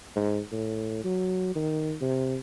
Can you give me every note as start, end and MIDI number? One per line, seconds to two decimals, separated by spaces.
0.16 0.40 44
0.52 1.02 45
1.05 1.55 54
1.55 1.95 51
2.01 2.37 48